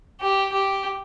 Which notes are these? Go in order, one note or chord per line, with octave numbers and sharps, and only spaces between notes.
G4
G4